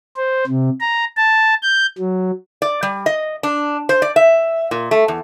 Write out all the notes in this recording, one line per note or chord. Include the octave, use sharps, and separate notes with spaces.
C5
C3
A#5
A5
G6
F#3
D5
G3
D#5
D4
C5
D5
E5
A#2
A3
E2